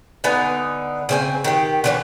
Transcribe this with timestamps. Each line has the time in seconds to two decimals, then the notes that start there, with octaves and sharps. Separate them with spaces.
0.24 D3 B3 D#4 G#5
1.09 C#3 C4 G#5
1.44 D#3 G4
1.84 D3 E3 C#4